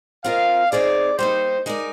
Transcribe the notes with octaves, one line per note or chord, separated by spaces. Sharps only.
C4 F4 A#4 D#5 F5
C4 D#4 G#4 C5 D5
G3 A#3 D#4 C5
G#3 D#4 A#4 D5